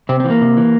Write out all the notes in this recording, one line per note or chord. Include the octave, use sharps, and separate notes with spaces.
C3 C4
C4
E3
A#3
C3
E3